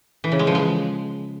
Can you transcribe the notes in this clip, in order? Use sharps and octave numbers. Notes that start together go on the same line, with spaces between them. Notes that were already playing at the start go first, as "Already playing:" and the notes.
E3
C#3
G#3
F3
G#3